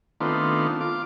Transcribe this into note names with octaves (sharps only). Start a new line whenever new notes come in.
D#3 A3 B3 C4 D4 F4
F4 D6